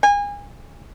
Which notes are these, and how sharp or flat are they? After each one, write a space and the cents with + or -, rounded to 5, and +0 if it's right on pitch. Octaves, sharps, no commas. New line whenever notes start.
G#5 -30